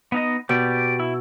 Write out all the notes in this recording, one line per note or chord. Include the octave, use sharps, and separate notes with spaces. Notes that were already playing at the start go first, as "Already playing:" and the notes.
B3 D#4 D#5
B2 G4 D5
E4